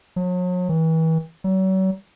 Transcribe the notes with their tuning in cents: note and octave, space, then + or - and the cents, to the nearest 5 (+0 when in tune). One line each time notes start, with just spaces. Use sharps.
F#3 -40
E3 -35
F#3 +40